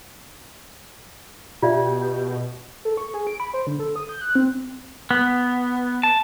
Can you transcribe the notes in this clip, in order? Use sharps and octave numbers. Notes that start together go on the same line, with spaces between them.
B2 F4 G4 D5 E5
A4
C#6
G#4
D7
B5
C5
D3
A4
D#6
G6
F#6
C4
B3
A5